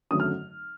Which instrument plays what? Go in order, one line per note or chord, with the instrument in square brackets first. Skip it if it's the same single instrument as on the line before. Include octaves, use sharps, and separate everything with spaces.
[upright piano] G#1 F#2 D3 F#3 A3 D#6
F6